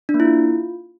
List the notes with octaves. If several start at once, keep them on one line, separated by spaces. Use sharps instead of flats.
D4
A#3
E4
F4